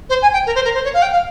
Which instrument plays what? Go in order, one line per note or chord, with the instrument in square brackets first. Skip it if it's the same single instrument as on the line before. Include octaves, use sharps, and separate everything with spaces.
[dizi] C5
G#5
G5
A#4
C5
A#4
C5
C#5
F5
G5
F5